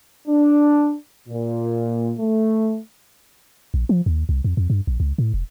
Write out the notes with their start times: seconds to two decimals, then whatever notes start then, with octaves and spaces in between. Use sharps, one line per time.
0.28 D4
1.29 A#2
2.19 A3
3.74 A#1
3.89 F3
4.06 D#2
4.29 C2
4.44 F2
4.57 F2
4.70 G2
4.87 A#1
5.00 C#2
5.18 A2
5.34 E1